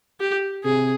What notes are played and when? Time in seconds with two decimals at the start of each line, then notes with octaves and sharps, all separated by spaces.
0.20 G4
0.64 C3 G#4